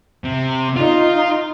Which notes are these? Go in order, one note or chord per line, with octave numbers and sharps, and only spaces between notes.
C3
D#4 F4